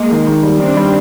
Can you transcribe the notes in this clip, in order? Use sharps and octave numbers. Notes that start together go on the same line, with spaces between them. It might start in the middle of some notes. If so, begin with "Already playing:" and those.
Already playing: G#3 A#3
D#3
D#3
G3
D#3 C4 D4
G3